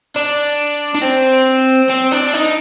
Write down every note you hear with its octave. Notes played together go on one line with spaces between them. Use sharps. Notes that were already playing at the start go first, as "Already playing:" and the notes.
D4
D4
C4
C4
D4
D#4